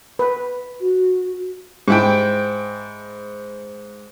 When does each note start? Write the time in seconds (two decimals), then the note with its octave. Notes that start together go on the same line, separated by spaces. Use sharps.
0.19 B4
0.81 F#4
1.88 G#2 E4 G5